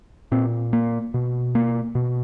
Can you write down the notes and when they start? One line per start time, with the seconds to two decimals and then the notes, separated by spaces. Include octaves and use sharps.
0.32 A#2 C4
0.73 A#3
1.14 B2
1.55 A#3
1.95 B2